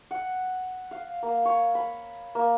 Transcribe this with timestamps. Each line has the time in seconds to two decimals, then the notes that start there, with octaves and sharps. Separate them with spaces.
0.11 F#5
0.91 F5
1.23 A#3
1.45 C#5
1.75 B5
2.35 A#3